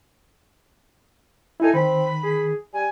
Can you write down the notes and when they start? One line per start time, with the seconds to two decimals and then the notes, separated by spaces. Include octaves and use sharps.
1.60 D#4 E4 A4 G#5
1.74 D#3 C4 B5
2.24 G#4
2.73 G3 G#5